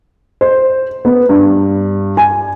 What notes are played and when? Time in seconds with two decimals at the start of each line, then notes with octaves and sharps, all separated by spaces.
0.41 C5
1.05 B3
1.29 G2
2.17 G#5